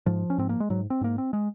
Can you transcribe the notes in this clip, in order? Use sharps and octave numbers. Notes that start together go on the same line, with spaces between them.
G#2 F3
C#4
G#2 C4
A#3
G#3
G#2 F#3
C4
G#2 A#3
C4
G#3